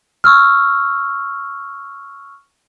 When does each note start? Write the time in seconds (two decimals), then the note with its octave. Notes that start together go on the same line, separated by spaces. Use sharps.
0.24 C#6 E6 F6